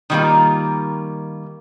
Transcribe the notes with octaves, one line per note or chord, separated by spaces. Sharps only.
D#3 G3 A#3 F4